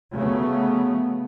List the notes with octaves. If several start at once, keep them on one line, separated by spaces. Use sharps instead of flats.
C#3 F#3 A3 B3